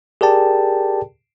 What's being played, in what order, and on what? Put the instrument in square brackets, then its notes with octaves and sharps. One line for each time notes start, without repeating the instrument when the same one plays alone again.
[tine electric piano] G4 G#4 A#4 D5 G5 A5